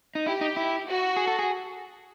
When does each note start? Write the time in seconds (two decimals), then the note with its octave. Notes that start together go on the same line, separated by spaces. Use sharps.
0.15 D#4
0.26 E4 G4
0.41 D#4
0.57 E4
0.87 F#4
1.17 G#4
1.27 A4
1.39 G#4